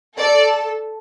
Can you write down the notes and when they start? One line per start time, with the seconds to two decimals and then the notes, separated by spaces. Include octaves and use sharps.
0.18 A4 D5